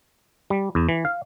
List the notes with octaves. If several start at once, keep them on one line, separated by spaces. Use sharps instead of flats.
G3
E2
E3
F5